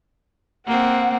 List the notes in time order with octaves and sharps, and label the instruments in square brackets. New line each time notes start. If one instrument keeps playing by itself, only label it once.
[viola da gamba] A#3 C4 [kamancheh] F#5